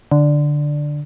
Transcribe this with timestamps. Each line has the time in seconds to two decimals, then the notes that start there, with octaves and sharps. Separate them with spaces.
0.11 D3